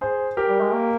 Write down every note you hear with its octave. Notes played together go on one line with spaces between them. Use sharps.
G#4 C5
G4 A#4
G3
G#3
A#3